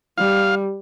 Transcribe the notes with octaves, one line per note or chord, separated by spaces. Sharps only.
G3 F5